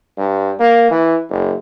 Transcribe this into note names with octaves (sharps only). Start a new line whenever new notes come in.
G2
A#3
E3
F#1